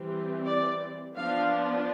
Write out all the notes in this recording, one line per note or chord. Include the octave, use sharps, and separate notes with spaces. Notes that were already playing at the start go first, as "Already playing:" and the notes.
Already playing: E3 G3 C4
D5
F3 B3 D4 F5